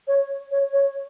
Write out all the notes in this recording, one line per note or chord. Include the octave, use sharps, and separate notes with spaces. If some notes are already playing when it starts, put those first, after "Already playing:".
C#5
C#5
C#5